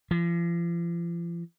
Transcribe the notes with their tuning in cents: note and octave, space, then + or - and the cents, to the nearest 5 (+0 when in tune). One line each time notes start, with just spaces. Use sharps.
F3 -40